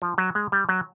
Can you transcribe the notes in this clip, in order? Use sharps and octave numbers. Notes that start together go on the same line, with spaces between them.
F3
F#3
G#3
G3
F#3